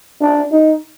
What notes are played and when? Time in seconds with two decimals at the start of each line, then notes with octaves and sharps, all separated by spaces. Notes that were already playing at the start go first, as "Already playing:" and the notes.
0.21 D4
0.52 D#4